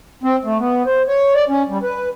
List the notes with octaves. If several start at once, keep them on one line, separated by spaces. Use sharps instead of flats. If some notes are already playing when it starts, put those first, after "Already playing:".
C4
A3
B3
C5
C#5
D5
C#4
G3
B4